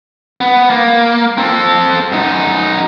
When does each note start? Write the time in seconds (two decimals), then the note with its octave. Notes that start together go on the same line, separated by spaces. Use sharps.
0.41 B3
0.70 A#3
1.38 C4 A4
2.12 F#2 D#4